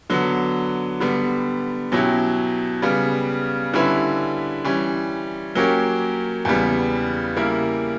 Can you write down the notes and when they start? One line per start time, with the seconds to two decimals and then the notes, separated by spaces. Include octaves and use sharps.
0.10 D3 F#3 B3
1.00 D3 G3 B3
1.92 B2 F#3 C#4 E4 G4
2.82 C#3 G3 B3
3.73 D3 G3 C#4 E4 B4
4.65 E3 G3 C#4
5.55 F#3 A#3 C#4 G4 A#4
6.45 E2 C#3 G3 B3
7.37 C#3 G3 A#3 E4 A#4